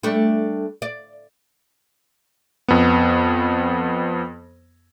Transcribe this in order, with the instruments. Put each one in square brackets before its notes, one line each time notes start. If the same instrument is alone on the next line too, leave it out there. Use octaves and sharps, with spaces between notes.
[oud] G3 A3 D4
D5
[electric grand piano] F2 B3